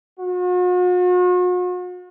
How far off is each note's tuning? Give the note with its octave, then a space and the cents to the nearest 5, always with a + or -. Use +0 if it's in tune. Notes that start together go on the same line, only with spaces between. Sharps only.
F#4 -45